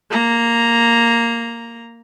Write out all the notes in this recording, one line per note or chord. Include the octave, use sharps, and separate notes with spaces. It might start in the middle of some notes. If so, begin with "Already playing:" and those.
A#3 A#5